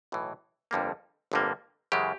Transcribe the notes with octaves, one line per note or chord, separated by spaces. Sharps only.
B1 A2 E3
G1 F2 D3 G3 A#3
G1 F2 D3 G3 A#3
F#2 C#3 E3 G#3 G4